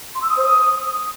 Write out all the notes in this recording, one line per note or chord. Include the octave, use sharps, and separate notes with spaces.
C6
E6
D#6
C5
D#6